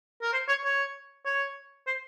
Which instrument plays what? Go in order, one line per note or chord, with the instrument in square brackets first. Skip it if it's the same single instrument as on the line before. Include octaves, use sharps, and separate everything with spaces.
[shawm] A#4
C5
C#5
C#5
C#5
C5